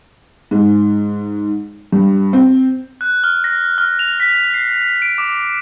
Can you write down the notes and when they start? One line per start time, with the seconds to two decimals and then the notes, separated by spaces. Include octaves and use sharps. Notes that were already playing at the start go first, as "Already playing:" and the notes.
0.51 G#2
1.92 G2
2.33 C4
3.01 F#6
3.24 F6
3.44 A#6
3.78 F6
3.99 F7
4.20 B6
4.54 C7
5.02 D7
5.18 D6